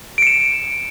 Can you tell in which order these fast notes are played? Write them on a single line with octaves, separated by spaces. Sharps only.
D7 C#7 E7